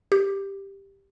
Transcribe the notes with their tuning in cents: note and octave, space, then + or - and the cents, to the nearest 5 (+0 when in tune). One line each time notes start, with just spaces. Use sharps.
G4 +5